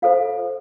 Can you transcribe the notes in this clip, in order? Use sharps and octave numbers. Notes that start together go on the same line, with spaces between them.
F4 A4 C5 F5